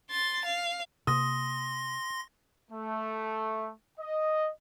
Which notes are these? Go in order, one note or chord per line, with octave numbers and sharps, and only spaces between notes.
C6 A6
F5
C3 A#3 C6 D#6 A#6
A3
D#5